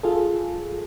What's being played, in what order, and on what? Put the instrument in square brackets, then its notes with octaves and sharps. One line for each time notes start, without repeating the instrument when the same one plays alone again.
[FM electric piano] F4 G#4 A4